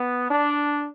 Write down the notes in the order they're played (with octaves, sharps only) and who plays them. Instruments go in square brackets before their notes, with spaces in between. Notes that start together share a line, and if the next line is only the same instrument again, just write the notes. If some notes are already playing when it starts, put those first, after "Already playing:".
Already playing: [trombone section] B3
D4